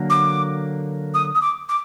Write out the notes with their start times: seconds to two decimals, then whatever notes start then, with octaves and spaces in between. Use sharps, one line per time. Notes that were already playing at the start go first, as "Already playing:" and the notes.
Already playing: D3 F#3 A#3
0.10 D6
1.14 D#6
1.35 D#6
1.41 D6
1.69 D6